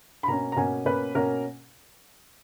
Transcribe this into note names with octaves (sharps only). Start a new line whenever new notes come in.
B5
B2 A#3 C#4 A#5
A#5
B2 A#3 C#4 G#5
B2 A#3 C#4 B4
B2 A#3 C#4 A#4